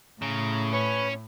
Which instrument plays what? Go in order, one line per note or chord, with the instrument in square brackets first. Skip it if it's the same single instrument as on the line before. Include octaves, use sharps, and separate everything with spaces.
[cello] A2 [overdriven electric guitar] C#3 [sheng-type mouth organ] A#5
[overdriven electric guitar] C#4 [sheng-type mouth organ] B4 C#5 C#6